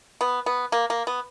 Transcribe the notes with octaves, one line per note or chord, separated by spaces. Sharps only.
B3
B3
A#3
A#3
B3